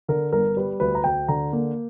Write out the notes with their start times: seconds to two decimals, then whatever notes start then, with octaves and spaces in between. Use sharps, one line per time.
0.08 D3 A#4
0.32 G1 A#4
0.57 G3 B4
0.80 D2 B4
0.95 A#5
1.04 D2 G5
1.28 D3 A#5
1.53 A#3